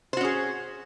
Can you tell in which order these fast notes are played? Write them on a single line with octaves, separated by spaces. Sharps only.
C5 F#4 C#4 G#4